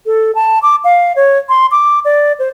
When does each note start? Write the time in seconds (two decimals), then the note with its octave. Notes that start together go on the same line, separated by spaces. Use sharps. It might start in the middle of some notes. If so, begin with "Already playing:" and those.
0.06 A4
0.35 A5
0.62 D6
0.84 F5
1.16 C#5
1.49 C6
1.71 D6
2.05 D5
2.39 C5